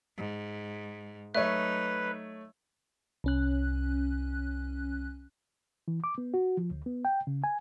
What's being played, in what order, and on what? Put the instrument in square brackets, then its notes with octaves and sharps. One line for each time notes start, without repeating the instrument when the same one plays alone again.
[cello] G#2
[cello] F#3 D#4 [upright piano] A3 C#5 [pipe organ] B4 [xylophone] E5
[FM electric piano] C2 C#4 F#6
[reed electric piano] E3
D6
B3
F#4
F3
D2
B3
G5
C#3
G#5